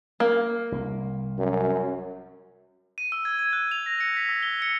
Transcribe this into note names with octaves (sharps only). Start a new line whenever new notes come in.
A#3
C2
F#2
D#7
E6
G#6
G#6
F#6
F7
A#6
C#7
B6
E6
G7
C#7